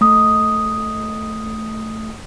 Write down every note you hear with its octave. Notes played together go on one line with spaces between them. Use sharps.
A3 D#6